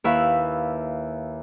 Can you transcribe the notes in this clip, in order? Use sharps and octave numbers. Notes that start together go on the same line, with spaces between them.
D#2 E4 B4 E5 F5